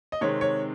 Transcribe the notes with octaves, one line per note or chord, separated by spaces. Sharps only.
D#5
C3 D#3 G#3 C4 C#5
C#5